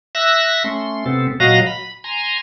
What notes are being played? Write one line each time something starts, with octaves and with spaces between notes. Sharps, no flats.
E5 E6 F#6 A#6
A3 C#4 C6
C3 B3 C4 A4
A#2 F#3 F#4 D#5 F5 A#6
B5
G#5 A#5 C6